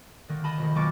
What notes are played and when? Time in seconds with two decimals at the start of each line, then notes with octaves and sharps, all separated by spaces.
0.28 D3 D#3 A#3
0.44 D#5 A5 B5
0.58 F1 D#3
0.75 B1 A#3 C#6 D6 A6 D7